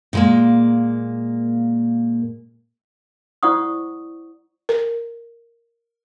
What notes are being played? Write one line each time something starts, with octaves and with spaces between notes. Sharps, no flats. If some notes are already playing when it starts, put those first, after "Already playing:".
A#2 G#3 A#3
E4 C5 D5 F#5 C#6 D#6
A#4